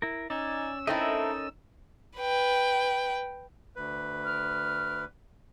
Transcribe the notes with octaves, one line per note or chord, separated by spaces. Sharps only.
E4 A#4
C#4 D#4 D5 G#5 E6
A3 C4 D#4 E4 A4 A#4 D#5
B4 G5
D2 B4
F6